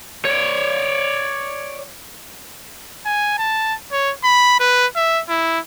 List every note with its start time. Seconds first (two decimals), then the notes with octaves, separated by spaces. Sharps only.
0.25 C#5 D5
3.06 G#5
3.38 A5
3.91 C#5
4.24 B5
4.60 B4
4.96 E5
5.29 E4